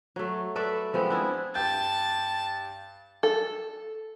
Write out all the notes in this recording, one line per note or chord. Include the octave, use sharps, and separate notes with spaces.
F#3 A3
A4 B4 D5 E5
F3 G#3 B3 C4
D4 E4 G#4
G2 G5 A5 G6
A4